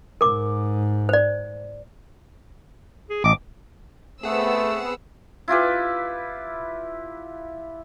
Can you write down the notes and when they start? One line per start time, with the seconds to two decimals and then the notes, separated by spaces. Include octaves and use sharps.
0.21 G#2 A#4 D6
1.09 C5 D5
3.10 G#4
3.24 A1 D#5 D6
4.23 A3 B3 C4 G#4 F#5 E6
5.48 E4 F4 G4 B4